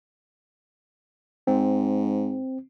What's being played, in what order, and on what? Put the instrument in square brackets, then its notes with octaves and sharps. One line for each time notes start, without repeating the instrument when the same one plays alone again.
[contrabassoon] G#2 [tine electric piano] C4